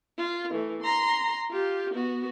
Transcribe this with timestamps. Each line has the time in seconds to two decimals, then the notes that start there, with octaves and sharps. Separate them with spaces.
0.18 F4
0.51 E3 A3
0.83 A#5 C6
1.51 F4 G4
1.94 B3 F#4